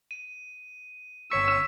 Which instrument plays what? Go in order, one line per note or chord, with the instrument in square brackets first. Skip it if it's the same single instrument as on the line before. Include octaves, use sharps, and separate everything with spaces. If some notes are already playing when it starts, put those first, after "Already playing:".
[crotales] D#7
[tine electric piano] G1 C#5 C#6 [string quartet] E6 [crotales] B6